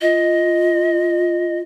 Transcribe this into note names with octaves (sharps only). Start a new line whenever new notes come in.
F4 D#5